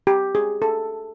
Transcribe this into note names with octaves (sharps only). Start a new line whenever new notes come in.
G4
G#4
A4